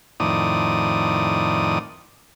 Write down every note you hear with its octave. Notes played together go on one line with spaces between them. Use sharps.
F2 A2 D#3 D5 D#6